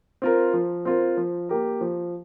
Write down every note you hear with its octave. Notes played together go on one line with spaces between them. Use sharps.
C4 F4 A#4
F3
C4 F4 A#4
F3
A#3 G4 A#4
F3